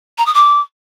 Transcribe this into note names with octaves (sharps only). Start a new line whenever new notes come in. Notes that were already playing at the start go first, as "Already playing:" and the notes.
A#5
D#6
D6